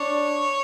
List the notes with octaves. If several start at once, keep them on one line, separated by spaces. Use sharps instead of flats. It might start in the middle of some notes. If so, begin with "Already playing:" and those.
Already playing: D4 C#5